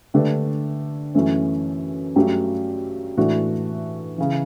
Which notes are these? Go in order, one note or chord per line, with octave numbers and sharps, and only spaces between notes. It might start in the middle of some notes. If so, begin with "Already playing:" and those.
D3 A3 D4 G4 B4
F#2 E3 A3 C#4
G2 F#3 A3 C#4 G4
A2 E3 A3 D4 F#4
C#3 E3